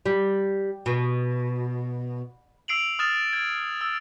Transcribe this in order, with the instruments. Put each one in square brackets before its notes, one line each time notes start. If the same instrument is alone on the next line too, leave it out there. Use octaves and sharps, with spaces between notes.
[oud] G3
B2
[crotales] E6 C7 D7 F7 F#7
D#6 F6 A6 E7
G#6
E6